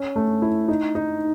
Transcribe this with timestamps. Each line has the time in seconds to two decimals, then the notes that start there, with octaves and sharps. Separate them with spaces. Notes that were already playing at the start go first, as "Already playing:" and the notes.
Already playing: C#4
0.16 A3
0.42 E4
0.68 D#4
0.95 D#4